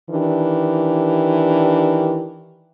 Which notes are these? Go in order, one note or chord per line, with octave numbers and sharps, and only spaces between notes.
D#3 E3 D4 G4